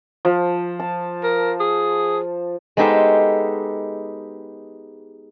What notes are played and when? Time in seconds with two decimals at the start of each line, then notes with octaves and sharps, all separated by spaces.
0.25 F3
0.80 A5
1.23 A#4
1.60 G#4
2.77 G#3 B3 D#4 G4 A4 C5